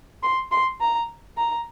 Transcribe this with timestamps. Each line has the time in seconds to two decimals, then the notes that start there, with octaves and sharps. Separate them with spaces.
0.23 C6
0.51 C6
0.81 A#5
1.37 A#5